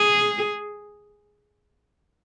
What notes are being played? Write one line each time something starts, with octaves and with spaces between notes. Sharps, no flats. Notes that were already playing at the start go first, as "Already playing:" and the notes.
Already playing: G#4